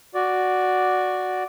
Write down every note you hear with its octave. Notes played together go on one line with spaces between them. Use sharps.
F#4 D5